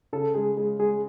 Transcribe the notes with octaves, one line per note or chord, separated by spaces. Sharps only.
C#3 A4
G#3 G#4
G#3 G#4
G#3 G#4